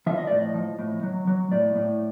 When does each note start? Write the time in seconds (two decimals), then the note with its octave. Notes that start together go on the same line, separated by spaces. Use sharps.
0.06 F3 E5
0.17 D#5
0.27 A2 D5
0.38 D#5
0.54 F3
0.79 A2
1.03 F#3
1.27 F#3
1.51 A2 D5
1.76 A2